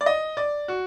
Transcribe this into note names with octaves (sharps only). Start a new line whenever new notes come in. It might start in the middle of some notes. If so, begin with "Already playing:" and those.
D5
D#5
D5
F#4